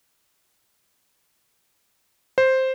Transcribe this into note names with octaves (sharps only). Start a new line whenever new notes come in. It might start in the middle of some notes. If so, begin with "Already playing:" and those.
C5